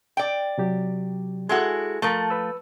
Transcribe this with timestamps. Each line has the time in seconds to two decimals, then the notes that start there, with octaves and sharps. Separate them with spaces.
0.17 D5 G5
0.58 C3 F#3 G4
1.49 G#3 E4 F#4 G#4 A4
2.02 F3 A3 A#4 A5
2.30 B4 E6